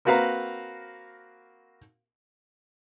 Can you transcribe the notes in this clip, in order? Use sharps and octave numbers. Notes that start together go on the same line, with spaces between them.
A#3 C4 F#4 B4 F5 A#5